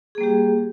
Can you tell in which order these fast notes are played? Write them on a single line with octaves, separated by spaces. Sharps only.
G#4 A#3 G3 G4